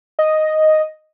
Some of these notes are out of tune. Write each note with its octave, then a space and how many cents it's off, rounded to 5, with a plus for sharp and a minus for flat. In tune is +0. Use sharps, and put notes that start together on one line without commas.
D#5 +0